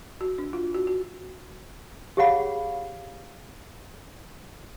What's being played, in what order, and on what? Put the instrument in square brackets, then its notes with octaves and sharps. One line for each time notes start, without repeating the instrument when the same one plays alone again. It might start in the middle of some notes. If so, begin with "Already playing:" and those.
[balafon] F#4
D4
F4
F#4
F#4
[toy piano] G4 G#4 C#5 F5 F#5 B5